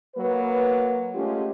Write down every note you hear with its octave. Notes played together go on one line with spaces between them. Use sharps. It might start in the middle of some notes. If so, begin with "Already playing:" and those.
F#3 A#3 B4
G#3 A3 C#4 F4 G4